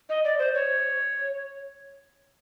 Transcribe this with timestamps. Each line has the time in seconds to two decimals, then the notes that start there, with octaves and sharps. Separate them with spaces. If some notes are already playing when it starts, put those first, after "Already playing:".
0.09 D#5
0.24 D5
0.39 C5
0.54 C#5